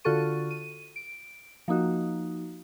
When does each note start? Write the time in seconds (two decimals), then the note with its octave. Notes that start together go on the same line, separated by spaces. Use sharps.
0.04 D3 F4 F#4 A4 C#6 D#7
0.51 D#7
0.96 D7
1.68 F3 A#3 D#4 F#4